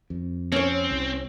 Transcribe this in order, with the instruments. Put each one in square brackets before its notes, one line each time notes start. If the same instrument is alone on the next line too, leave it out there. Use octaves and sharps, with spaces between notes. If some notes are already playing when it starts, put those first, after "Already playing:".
[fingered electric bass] F2
[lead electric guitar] C4 [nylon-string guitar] C#4 C#5
[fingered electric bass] C2